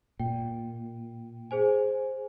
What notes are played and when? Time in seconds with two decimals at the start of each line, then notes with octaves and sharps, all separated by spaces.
0.19 A#2 G5
1.51 G#4 C5 G#5